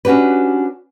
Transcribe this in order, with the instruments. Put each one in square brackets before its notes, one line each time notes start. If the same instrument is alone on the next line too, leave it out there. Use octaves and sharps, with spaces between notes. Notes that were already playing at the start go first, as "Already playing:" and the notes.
[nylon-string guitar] C#4 D4 F#4 G4 B4